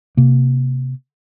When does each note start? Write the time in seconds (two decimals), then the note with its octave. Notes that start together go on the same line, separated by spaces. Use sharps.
0.17 C3 A#3